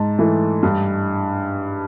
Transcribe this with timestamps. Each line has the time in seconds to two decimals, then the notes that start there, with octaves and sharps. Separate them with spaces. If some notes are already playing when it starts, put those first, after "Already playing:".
Already playing: G#2 A5
0.19 E3 A3
0.63 G2